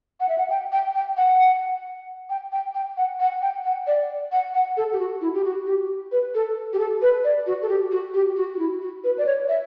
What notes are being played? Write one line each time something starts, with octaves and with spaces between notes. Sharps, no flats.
F#5
E5
F#5
G5
G5
G5
F#5
G5
G5
G5
F#5
F#5
G5
F#5
D5
F#5
F#5
A4
G4
F#4
E4
G4
F#4
G4
B4
A4
G4
A4
B4
D5
F#4
A4
G4
F#4
G4
F#4
F#4
E4
F#4
B4
D5
C#5
E5